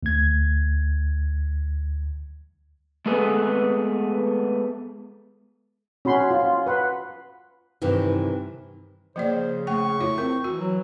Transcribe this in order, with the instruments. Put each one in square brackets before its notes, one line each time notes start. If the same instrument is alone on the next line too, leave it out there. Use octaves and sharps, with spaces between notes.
[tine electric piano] D2 G#6
[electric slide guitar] G#3 A3 B3 G#4 A4 B4
[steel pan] C#4 F#4 B5 C6
F4
B4 F#5 B5 C6
[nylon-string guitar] G2 C3 D#3 E3
[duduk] C#3 [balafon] F3 A#3 D5 [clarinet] C5
[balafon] A3 G5 [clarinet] C#6
[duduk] A3 [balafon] E4 F4 C#5
[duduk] C4 [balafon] A#4
[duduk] E3 [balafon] F#4
[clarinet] F#3